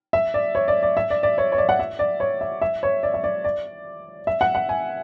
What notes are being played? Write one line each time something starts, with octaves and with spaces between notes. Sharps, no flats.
E5
D5
C#5
D5
D5
E5
D5
D5
C#5
C#5
D5
F#5
E5
D5
C#5
E5
E5
C#5
D5
E5
D5
D5
E5
F#5
F#5
G#5